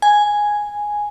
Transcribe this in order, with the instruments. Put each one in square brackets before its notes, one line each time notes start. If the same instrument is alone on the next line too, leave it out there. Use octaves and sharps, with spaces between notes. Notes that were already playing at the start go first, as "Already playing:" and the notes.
[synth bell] G#5